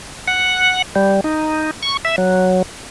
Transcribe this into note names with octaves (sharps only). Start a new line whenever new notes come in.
F#5
G3
D#4
C#6
E5
F#3